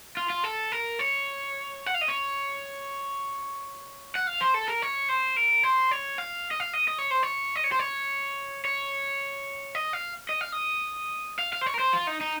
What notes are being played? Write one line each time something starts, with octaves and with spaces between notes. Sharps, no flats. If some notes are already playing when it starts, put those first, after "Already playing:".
F4
F4
A4
A#4
C#5
F#5
F5
D#5
C#5
F#5
F5
C5
A4
A#4
C#5
C5
A#4
C5
C#5
F5
D#5
F5
D#5
D#5
C#5
C5
C#5
D#5
C#5
C5
C#5
C#5
D#5
F5
D#5
F5
D#5
F5
F5
C5
C#5
A#4
C5
F4
D#4
D#4